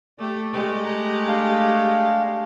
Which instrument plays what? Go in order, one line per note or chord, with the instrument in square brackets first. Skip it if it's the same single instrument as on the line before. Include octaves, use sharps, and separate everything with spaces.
[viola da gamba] A3 G4 [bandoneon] D5
[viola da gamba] G#3 A3 G4
[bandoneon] A#5 F#6
D4 F5